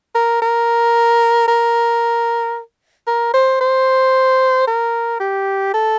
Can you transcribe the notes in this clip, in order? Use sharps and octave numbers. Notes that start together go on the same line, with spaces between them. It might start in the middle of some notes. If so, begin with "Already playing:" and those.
A#4
A#4
A#4
A#4
C5
C5
A#4
G4
A4